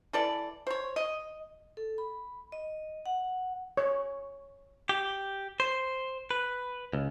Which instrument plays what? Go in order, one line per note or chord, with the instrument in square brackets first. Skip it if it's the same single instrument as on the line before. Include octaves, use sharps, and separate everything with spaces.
[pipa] E3 A4 D5
C5 C#5
D#5
[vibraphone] A4
B5
D#5
F#5
[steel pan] C#5
[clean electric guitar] G4
C5
B4
C#2